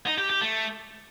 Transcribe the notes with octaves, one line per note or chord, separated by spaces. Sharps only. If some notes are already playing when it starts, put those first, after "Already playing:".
D#4
G4
G4
A3